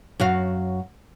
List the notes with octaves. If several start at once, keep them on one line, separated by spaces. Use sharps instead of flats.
F#2 F#4 F5